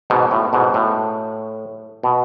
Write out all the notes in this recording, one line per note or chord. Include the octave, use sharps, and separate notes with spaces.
G#2 B2
A2
G#2 B2
A2
B2